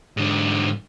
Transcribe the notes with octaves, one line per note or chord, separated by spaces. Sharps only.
G#2 D3